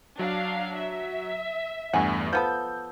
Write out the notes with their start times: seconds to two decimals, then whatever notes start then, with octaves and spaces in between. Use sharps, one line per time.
0.19 F#3 D4 F5
0.76 E5
1.93 E2 G2 A3 F#5 G#5
2.33 F3 B3 A4 G6